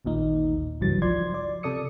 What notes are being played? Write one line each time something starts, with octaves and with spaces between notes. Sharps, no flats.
A1 D#2 A#2 D#4
G#1 C#2 G2 E3 F#3 A6
F3 D5 C6 G#6
D5
C3 A4 D5 D#6 C#7